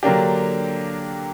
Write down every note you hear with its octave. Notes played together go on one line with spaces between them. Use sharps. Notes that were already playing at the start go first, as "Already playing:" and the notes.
D3 F#3 A#3 D4 G4